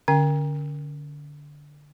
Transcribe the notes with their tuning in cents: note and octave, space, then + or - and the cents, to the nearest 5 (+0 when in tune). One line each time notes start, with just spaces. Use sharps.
D3 +0 C#4 +10 G5 +30